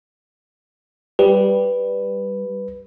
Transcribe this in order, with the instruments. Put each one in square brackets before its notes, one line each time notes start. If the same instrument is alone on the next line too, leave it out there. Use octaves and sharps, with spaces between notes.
[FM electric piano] G3 [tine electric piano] B4